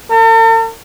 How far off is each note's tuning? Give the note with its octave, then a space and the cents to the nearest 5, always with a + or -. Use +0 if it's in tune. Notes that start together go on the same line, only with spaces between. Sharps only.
A4 +45